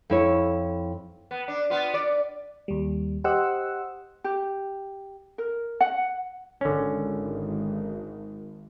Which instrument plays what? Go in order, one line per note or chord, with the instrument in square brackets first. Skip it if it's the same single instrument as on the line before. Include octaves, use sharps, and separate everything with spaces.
[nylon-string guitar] F2 E4 C#5
[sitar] B3
D4
B3 F4
D5
[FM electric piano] D#2 G3
G4 C5 D#5 F#5 E6
[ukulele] G4
A#4
F#5
[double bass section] G#1 [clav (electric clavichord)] D3 C#4